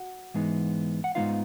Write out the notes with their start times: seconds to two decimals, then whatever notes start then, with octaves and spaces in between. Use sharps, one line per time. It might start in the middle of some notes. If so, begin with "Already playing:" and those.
Already playing: F#4 F#5
0.34 G#2 E3 G#3 B3 D#4
1.04 F#5
1.15 G#2 E3 G#3 B3 D#4 F4 F5